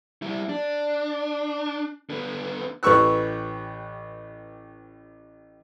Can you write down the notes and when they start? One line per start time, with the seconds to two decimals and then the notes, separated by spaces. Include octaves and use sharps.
0.22 G3 E4
0.49 D4
2.10 D3 B3
2.83 A1 G4 B4 C#6 E6 F#6